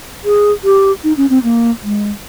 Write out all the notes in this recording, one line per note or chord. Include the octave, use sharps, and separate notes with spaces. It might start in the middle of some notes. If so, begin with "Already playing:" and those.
G#4
G4
D#4
C#4
C4
A#3
G#3